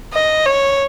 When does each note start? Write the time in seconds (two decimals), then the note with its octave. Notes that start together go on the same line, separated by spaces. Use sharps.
0.13 D#5
0.46 C#5